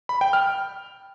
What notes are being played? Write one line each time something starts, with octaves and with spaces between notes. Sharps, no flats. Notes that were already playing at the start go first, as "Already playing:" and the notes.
B5
G5
F6